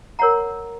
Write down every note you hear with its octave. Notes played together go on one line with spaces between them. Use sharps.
A#4 C#5 F#5 A#5